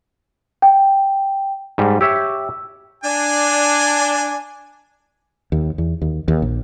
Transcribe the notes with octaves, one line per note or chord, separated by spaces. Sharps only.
G5
G#2 G3
G4 C#5 E5 E6
D4 G#5
D#2
E2
D#2
D#2
A#1